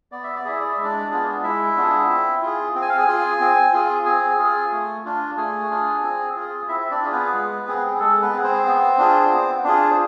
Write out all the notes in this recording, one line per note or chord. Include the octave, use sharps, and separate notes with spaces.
B3 D5
E5
D5
E4 G#4 E5
D5
E5
G#3
D4 D5
B3 D4 F4 G#4
G#3 E4 E5
B3 D4 F4 G#4
C4
F4 G#4
C4
G#5
F5
G#4 G#5
F4 G#4
C4
F4 G#4
C4 G#4 G#5
F4 G#4
A3
D4 F4
A3 G#4 G#5
D4 F4
C4
F4 G#4
C4 E4 E5
E5
D4 D5
F4 G#4
B3 B4
G#3
C4 G#4
G#4
G#3 A4
B3 B4
C4
G#4
C4 C5
B3
D4 F4 G#4
B3
D4 F4 G#4
C5